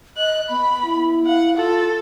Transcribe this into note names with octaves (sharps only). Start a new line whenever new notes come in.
D#5 F#6
B3 B5
E4
F5 F#5
F4 A4